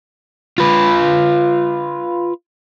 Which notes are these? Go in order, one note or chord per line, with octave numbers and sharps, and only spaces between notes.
F4 B4